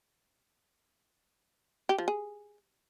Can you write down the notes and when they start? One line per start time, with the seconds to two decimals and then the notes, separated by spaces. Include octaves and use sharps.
1.89 G4
1.98 F3
2.08 G#4